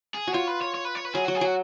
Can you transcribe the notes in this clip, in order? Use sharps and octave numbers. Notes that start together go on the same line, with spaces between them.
G#4
F#4
F4 C#5
B4
C#5
C#5
B4
C#5
B4
F#3 G#4
F#3 F#4
G#4
F#3 F#4